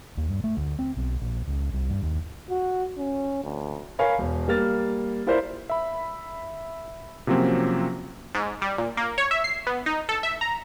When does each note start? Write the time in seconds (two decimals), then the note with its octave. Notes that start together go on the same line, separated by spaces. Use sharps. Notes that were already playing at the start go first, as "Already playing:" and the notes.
0.17 D#2
0.29 G2
0.44 A3
0.57 D2
0.79 C4
0.97 B1
1.21 A#1
1.48 C#2
1.73 C2
1.90 G2
2.03 D#2
2.50 F#4
2.98 C#4
3.43 D2
3.99 A#4 C#5 F5 G#5 B5
4.18 E1
4.48 G3 A#3 F6 A6
5.27 E4 F4 A#4 C5 D5 E5
5.70 E5 B5
7.27 C3 F3 F#3 A#3 C4 C#4
8.35 G#2
8.62 G3
8.78 A#2
8.97 A#3
9.18 C#5
9.31 E5
9.44 C7
9.67 B3
9.86 D#4
10.09 A4
10.23 E5
10.41 A#5